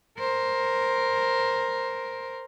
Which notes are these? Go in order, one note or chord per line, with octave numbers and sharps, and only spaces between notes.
A#4 C5